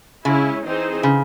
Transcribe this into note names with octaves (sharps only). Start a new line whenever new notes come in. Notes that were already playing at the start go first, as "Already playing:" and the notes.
C#3 G#3 C#4 E4
E3 C4 D#4 G#4 C5
C#3